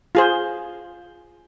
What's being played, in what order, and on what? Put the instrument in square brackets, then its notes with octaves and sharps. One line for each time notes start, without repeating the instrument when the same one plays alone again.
[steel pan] F4 G#4 C5